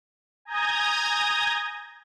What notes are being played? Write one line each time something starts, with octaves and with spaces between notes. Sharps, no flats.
G#5 A#5 D#6 G6 G#6 A#6